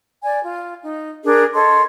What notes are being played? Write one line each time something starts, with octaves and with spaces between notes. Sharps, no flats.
D5 G#5
F4
D#4
D4 G#4 A#4
A4 C#5 D#5 C6